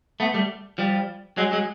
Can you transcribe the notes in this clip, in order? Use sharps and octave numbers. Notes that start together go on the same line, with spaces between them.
A3 B3
G3 A3
F3 G3
F#3 G#3
F#3 G#3